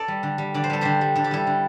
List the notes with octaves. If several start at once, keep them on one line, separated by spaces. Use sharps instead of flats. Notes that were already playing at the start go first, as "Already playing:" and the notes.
Already playing: A4 D5
G3
D3
G3
D3 D5
C5
G3 A4
D3 G4 C5
G3
D3 A4
G4
G3 E4 A4
D3